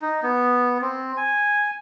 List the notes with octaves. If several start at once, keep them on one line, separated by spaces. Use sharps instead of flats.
D#4
B3
C4
G#5